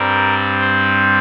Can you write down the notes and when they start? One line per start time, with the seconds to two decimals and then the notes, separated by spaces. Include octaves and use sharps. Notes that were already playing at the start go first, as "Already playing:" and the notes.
Already playing: G2 G3 C4 A#4
0.60 C5